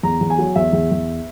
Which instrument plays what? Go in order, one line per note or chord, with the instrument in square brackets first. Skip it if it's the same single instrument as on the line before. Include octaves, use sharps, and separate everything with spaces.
[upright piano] E2 A#5
E2
G#5
F#3
E2 E5
E2
E2